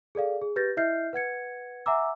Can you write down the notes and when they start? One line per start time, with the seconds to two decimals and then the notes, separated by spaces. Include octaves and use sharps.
0.15 G#4 A4 D5 F5
0.42 G#4
0.56 G4 B4 G6 A6 A#6
0.77 E4 D#5 E5 F6 G6 C7
1.13 B4 F#5 G#6 C#7
1.86 E5 F#5 G#5 A#5 D6 E6